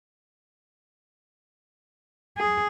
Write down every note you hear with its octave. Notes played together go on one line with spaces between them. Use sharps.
G#4